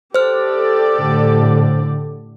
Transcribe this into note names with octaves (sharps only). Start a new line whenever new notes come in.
G4 A4 C5 D5 F6
A2 D3